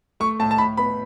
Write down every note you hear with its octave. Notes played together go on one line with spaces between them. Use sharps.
A3 C#6
A2 A5
A5
A2 B5
B3 B5